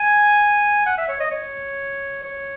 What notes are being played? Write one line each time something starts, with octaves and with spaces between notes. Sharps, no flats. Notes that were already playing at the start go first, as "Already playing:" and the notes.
Already playing: G#5
F#5
E5
C#5
D#5
C#5
C#5